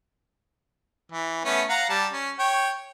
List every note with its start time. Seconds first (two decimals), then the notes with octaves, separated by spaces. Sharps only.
1.12 E3
1.45 A3 B3 C#4
1.69 F5 F#5 A#5
1.90 G3 A5
2.13 C#4
2.39 C#5 G5